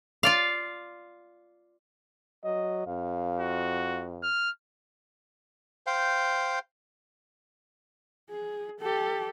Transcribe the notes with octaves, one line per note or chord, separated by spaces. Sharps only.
F4 D5 F5
F#3 D#5
F2 F5
F#4
F6
C5 F5 G5
G#4
G4 A4